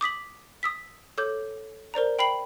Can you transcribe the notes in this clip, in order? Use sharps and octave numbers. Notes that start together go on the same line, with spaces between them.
D6 D#6 B6 F#7
D#6 E6 B6
A4 C#5 D6 G6
A#4 C5 D5 A#5
G5 B5 C7 F#7